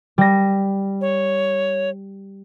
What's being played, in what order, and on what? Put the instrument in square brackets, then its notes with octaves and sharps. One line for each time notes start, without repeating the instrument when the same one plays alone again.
[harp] G3 A#6
[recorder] C#5